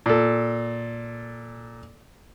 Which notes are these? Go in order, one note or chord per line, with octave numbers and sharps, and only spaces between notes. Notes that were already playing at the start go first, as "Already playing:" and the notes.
A#2 A4